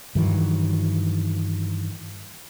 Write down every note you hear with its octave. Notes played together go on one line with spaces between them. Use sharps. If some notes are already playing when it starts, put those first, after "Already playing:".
G2 D#3 E3 F#3